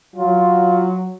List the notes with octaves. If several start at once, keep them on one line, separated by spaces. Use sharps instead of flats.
F#3 F4